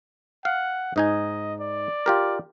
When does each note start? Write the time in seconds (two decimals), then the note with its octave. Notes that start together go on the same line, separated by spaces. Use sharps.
0.45 F5 F#5
0.96 G#2 D#4 D#5 G#5
1.60 D5
2.06 F4 G4 A#4